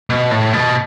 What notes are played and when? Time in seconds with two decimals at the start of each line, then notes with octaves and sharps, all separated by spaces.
0.10 B2
0.31 A2
0.53 B2